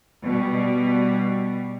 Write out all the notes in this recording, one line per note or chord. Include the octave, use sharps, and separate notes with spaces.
B2 G3